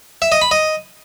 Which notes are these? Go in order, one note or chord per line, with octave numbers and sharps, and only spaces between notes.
E5
D#5
B5
D#5